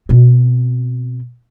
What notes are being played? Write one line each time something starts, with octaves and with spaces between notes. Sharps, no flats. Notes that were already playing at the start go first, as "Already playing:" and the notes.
B2 C4